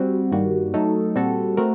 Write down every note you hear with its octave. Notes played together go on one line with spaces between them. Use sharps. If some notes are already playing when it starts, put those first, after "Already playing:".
Already playing: G3 C4 F#4
G2 D#3 G3 A#3 F#4
F#3 A3 D#4 A4
A#2 G3 C4 F#4 A4
A3 C4 F#4 A#4